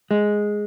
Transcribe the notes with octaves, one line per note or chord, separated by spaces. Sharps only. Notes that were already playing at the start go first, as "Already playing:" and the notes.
G#3